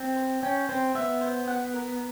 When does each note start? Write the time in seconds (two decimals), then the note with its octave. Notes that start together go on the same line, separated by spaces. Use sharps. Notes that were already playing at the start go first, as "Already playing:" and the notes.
Already playing: C4
0.16 C5
0.43 C#4 G5
0.69 C4 C5
0.95 B3 E5
1.21 C5
1.47 F#5
1.74 A#4